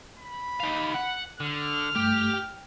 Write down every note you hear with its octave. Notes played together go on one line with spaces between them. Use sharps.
B5
D#3 F5
F#5
D3 F6
G2 A3 G4
G5